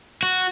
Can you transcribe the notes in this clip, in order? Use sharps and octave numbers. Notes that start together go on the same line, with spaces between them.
F#4